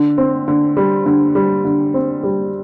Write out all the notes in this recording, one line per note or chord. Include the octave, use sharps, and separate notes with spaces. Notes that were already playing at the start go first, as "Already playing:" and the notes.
Already playing: D3
C4
D3
G3
D3
G3
D3
C4
G3